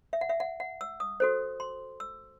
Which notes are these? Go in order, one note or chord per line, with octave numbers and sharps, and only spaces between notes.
E5
F#5
E5
F#5
F#5
E6
D#6
F#4 A4 C5
C6
E6